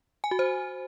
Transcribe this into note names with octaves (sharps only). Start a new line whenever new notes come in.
G#5
F#4
C5